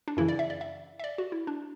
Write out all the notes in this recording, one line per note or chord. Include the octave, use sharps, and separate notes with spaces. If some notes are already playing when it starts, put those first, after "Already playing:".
D4
F#2 C#3 E3 E4
D5
E5
D5
E5
E5
D5
F#4
E4
D4